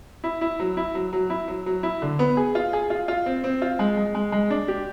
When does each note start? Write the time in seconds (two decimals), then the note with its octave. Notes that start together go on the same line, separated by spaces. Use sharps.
0.24 E4
0.41 E4
0.60 F#3
0.77 E4
0.95 F#3
1.13 F#3
1.30 E4
1.48 F#3
1.66 F#3
1.83 E4
2.02 D3
2.19 B3
2.37 G#4
2.55 F4
2.73 G#4
2.90 F4
3.08 F4
3.26 C4
3.44 C4
3.62 F4
3.79 G#3
3.97 G#3
4.15 G#3
4.32 G#3
4.50 D4
4.68 G4